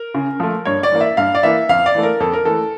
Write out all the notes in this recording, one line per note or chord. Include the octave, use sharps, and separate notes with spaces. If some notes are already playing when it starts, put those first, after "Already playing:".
Already playing: A#4
C#3
F3 A3
G2 C#5
D5
E3 A#3
E5
G2 F5
D5
E3 A#3 E5
F2 F5
D5
E3 A3
A#4
F2 A4
A#4
E3 A3 A4